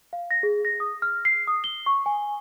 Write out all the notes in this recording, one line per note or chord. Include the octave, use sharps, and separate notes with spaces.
F5
A#6
G#4
A#6
D#6
F6
C7
D#6
G7
C#6
G#5